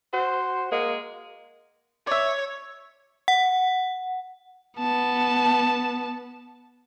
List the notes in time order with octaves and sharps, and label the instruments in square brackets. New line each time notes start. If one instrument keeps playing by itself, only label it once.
[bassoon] F#4 [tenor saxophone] C5
[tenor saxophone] G#3 [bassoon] A#3
[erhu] C#5 [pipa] D5 E5
[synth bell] F#5
[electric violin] B3 A5